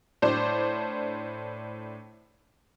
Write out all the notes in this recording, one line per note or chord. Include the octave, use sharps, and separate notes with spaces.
A2 D4 C5 D5